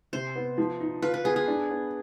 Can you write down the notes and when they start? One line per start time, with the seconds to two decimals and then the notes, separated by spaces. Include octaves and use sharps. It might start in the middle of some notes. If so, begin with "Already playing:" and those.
0.13 C3 C5
0.36 B3
0.58 F3
0.80 D#4
1.02 F4 B4
1.14 B4
1.24 B3 G#4
1.36 G#4
1.48 D4
1.69 B3